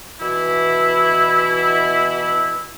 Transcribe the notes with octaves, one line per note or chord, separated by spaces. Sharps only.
B2 E3 E4